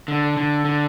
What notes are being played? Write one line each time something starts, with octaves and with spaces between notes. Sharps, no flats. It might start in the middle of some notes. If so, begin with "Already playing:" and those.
D3
D3
D3